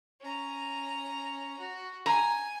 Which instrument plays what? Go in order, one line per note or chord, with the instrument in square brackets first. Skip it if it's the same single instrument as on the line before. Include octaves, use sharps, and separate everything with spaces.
[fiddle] C#4 A#5
F#4
[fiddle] G#5 [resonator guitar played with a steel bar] A#5